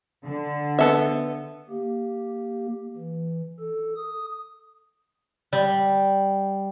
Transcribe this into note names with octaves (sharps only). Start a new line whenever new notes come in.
D3
B3 A4 E5
A#3 G4
E3
A4
D#6
G3